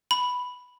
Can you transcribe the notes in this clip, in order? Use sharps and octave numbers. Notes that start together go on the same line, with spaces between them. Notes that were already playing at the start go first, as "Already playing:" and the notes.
B5